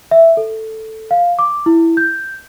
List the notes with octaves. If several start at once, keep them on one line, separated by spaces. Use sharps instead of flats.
E5
A4
F5
D6
E4
G6